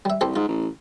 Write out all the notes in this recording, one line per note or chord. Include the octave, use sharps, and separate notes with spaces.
G3 E5
C2 G4 A4 C5
G#2 F4
A1